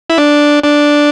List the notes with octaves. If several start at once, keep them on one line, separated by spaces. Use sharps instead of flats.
E4
D4
D4